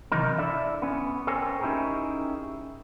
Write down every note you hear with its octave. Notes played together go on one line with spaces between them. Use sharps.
C3 D#3 E3 F#3 D#4 A#4
D4 E4 A4 D5 E5
B3 C#4
A4 A#4 C5 C#5 G5 G#5
C#4 D#4 E4 G4 G#4 A#4